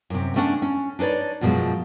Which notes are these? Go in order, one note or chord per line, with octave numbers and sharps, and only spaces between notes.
F#2 C3
A3 C#4 D4 F#5
C#4
D4 D#4 B4 C#5 D5
F#2 B2 F3 F#3 G#3